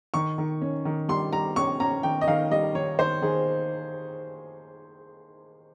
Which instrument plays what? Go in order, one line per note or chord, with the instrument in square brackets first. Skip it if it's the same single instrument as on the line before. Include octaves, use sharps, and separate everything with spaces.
[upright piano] D#3 C#6
D#3
C#4
D#3
G3 C6
G3 A#5
C#4 C#6
C#4 A#5
D#3 G5
D#5
D#3 F5
G3 D#5
D#3 C#5
D#3 C5
D#3 G#4